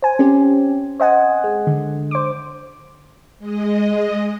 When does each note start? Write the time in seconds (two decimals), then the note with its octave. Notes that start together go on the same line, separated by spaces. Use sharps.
0.03 C5 G#5
0.19 C4 C#4 G4
1.00 C5 D#5 F#5 G#5
1.44 G#3
1.67 D3
2.11 C5 D6
3.39 G#3 D#5